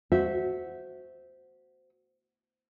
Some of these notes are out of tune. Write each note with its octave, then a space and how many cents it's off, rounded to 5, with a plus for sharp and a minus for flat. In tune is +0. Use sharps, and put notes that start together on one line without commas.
F#4 +0 C5 -10 E5 -15